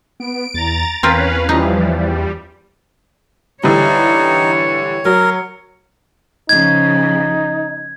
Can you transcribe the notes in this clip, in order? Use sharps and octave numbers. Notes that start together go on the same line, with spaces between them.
B3 D7
E2 A#5 A6
E2 C4 C#4 F4 A#4 B4 F5
E3 F3 G3 D#4
G3
D3 E3 G3 D#4 C#5
F#3 A#4
C#3 F3 D#4 G#6